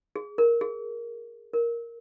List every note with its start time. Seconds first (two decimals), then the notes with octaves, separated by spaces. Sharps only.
0.16 G#4
0.38 A#4
0.61 G#4
1.53 A#4